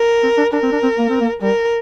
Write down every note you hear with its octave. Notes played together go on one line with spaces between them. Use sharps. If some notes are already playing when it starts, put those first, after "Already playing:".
Already playing: A#4
C4
D4
D4 A#4
C4
D4
C4
A#3
C4
A#3
G3 A#4